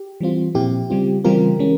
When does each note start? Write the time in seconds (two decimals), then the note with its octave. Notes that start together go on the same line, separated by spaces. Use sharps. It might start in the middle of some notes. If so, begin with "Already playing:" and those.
Already playing: G4
0.21 E3 G3 C4 F4
0.55 A#2 F3 C4 E4 G4
0.90 C#3 G3 C4 F4
1.24 C#3 E3 G3 C4 F4 G4 A#4
1.59 E3 G#3 C#4